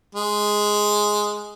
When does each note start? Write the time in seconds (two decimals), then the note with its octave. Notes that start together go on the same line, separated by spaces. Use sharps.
0.15 G#3